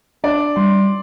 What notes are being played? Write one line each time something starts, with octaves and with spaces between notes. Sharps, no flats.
D4 D5
G3 C6